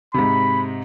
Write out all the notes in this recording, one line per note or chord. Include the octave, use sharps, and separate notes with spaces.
G#2 C3 B5